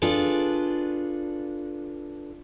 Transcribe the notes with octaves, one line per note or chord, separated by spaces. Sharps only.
D4 F4 G#4 A4 B4